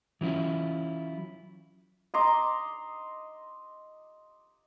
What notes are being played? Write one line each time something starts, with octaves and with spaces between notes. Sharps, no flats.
E3 F#3 C#4 E4 F4
D#5 A#5 C6 D6